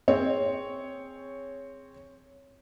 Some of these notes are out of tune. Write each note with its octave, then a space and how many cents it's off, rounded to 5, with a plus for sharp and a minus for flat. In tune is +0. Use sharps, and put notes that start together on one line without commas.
C4 +0 G#4 -15 C#5 +0